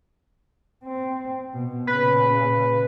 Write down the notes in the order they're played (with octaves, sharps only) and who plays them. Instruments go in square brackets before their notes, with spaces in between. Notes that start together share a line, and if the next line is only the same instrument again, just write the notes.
[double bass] C4
B2
[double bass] A#2 C#3 [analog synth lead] B4